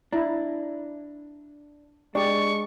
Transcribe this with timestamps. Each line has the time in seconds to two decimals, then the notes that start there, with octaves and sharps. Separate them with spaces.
0.13 D4 E4 A#5
2.15 G#3 D4 G4 D5 C#6